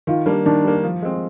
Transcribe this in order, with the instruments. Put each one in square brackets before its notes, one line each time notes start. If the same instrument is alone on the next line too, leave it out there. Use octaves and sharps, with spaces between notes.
[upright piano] D#3 [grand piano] F4
[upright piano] G3 A#3 [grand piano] D4
[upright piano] D#3 [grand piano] D4
[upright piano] G3 A#3
F3
G#3 C4